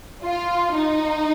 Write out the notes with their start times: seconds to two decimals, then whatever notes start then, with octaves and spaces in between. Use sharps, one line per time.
0.24 F4
0.75 D#4